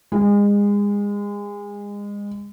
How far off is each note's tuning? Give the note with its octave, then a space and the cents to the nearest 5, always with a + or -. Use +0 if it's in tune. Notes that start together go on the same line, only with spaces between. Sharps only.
G#3 -30